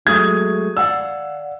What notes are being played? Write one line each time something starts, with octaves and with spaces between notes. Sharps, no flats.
F#3 G#3 A3 D#6 G#6
D5 F5 F#5 E6